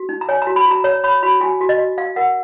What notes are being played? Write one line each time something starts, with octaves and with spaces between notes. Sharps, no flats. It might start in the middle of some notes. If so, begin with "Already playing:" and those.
Already playing: F#4
D#4
A#5
C#5 G#5
A#5
F#4
B5
F#4
A#5
C#5 A#5
C#5 B5
F#4 B5
F#4 G#5
F#4
D#5
F#4
F#4 F5
A#4 F#5